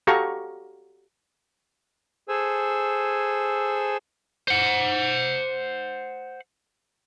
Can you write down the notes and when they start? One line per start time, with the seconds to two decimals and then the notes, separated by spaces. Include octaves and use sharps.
0.07 F#4 G4 A4 F5 A#5 C#6
2.29 G#4 A4 C5 G#5 E6
4.48 C5 F#5